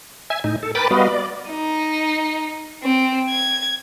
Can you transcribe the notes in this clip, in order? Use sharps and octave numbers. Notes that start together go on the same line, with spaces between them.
E5 G#5
A2 D#4
A4
A#4 B4 G5 B5 D6 A6
G3 B3 F#4 B4 D#5 F5
D5
D#4
C4
G#6